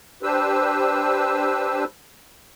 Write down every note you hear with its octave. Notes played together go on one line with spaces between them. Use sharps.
D4 G4 B4 C5 E6